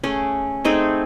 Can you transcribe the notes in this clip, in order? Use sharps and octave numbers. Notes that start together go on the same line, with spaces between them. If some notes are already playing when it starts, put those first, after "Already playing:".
A3 C#4 G#4
A3 C4 D#4 G#4